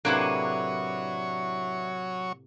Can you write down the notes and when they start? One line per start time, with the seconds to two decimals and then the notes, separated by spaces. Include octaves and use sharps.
0.05 A2 C3 F#3 A#3 D4 E4 B4 C#5